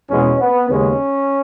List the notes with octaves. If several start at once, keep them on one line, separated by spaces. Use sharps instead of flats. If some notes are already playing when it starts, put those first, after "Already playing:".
E2 B2 G#3 B3 C#4
B3
D#2 C#3 G#3 B3 C#4